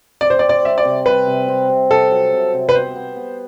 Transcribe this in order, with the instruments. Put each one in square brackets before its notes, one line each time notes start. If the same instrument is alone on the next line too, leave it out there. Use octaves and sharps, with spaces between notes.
[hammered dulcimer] C4 [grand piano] D5
[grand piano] C5
D5
[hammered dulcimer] C4
[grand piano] D5
[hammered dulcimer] G3 [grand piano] E5
[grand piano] D5
[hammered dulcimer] C3
[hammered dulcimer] G3 [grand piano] B4
[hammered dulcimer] C3
C4
C3
[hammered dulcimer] C3 [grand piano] A4
[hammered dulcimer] F#3
C3
C3
[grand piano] B4
[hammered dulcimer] B3 [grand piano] C5
[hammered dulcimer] B3
B3